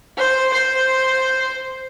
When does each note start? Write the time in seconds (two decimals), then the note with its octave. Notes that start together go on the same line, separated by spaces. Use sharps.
0.18 C5
0.54 C5